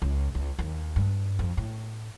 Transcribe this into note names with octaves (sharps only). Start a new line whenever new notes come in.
C#2
C#2
D#2
G2
F2
A2